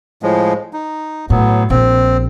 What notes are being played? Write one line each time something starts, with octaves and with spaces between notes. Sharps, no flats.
A2 F3 G#3
D#4
A2 F#3 B3
A#1 C4